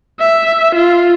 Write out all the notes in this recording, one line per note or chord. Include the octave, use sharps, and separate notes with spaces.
E5
F4